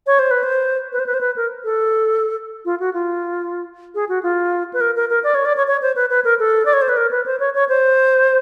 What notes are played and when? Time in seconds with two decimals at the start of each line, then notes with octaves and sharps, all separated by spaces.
0.07 C#5
0.19 C5
0.31 B4
0.44 C5
0.93 B4
0.99 C5
1.06 B4
1.14 C5
1.21 B4
1.36 A#4
1.64 A4
2.65 F4
2.80 F#4
2.94 F4
3.95 G#4
4.09 F#4
4.23 F4
4.73 B4
4.81 A#4
4.96 A#4
5.09 A#4
5.24 D5
5.35 C#5
5.45 D5
5.57 C#5
5.67 C#5
5.82 C5
5.96 B4
6.10 B4
6.25 A#4
6.39 A4
6.65 D5
6.73 C#5
6.82 C5
6.89 B4
6.97 A#4
7.11 B4
7.26 C5
7.40 C#5
7.55 C#5
7.69 C5